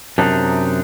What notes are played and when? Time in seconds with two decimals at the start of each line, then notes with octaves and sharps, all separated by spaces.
0.18 F#2 C3 D4 D#4